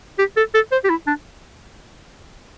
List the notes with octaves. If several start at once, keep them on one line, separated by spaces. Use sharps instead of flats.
G4
A4
A4
C5
G4
E4
D4